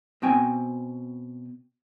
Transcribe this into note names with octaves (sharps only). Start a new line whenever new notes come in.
B2 C4 G5 G#5